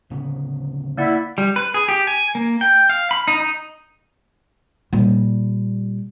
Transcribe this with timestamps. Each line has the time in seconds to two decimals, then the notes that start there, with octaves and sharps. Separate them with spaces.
0.10 D1 C#3 B3
0.97 A#3 E4 D5 F#5
1.38 G3
1.56 B4
1.74 G#4
1.89 G4
2.07 G#5
2.35 A#3
2.61 G5
2.90 F5
3.11 B5
3.28 D#4
3.40 D#4
4.93 A#2 G3